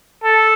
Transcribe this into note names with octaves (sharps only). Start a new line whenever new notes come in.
A4